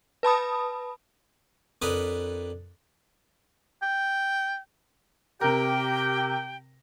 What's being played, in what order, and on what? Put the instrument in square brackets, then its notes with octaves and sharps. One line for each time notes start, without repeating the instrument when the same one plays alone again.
[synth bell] B4 A5 B5 D#6
[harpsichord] F2 D4 A#4 B4 B5 D#6
[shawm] G5
[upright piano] C3 A#4 [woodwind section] G4 G5